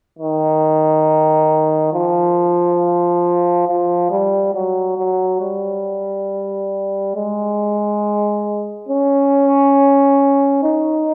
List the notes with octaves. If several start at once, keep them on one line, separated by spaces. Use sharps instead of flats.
D#3
F3
F3
G3
F#3
F#3
G3
G#3
C#4
D#4